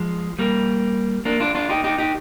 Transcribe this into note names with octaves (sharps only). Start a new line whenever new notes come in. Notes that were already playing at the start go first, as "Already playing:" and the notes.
Already playing: F3 G#3
G3 A#3
A#3 D4
D4 F4
D4 F4
D#4 G4
D#4 G4
D#4 G4